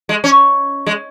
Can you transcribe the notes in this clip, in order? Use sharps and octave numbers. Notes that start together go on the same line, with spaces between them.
G#3
C#4
G#3